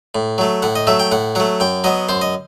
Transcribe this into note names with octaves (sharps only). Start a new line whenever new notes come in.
A2
F#3 A3
A2 F#5
D#5
F#3 A3 E5
G5
A2 F#5
F#3 A3 F#5
F#2 G5
F#3 B3 D#5
F#2 C5
D#5